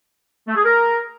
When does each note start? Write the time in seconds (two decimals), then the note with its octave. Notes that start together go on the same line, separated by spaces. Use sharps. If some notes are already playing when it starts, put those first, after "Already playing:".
0.47 A3
0.56 G#4
0.64 A#4